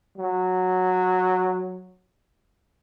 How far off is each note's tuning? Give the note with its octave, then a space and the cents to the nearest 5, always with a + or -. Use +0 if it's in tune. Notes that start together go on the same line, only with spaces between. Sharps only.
F#3 -10